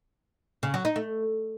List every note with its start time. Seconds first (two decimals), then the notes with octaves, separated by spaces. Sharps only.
0.63 C#3
0.74 F#3
0.85 D#4
0.96 A3